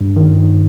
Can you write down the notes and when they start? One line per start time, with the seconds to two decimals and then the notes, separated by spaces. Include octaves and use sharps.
0.01 G2
0.16 D#3